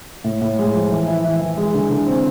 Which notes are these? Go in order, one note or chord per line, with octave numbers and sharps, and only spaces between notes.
A2
A2
G#3
F3
E3
E4
E3
E3
G#3
D3
D3
C4